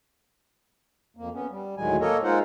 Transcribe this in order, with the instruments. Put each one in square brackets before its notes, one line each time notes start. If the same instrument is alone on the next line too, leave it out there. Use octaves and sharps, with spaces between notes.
[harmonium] F2 A#3
B3 C#4
G3
D2 A2 D#3 F#3 G#3 G#5
A#3 A4 A#4 C#5 D#5
G#3 D#4 F4 A#4 C5 F#5